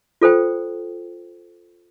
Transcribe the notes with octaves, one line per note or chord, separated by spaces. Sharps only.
F4 A4 C5 G5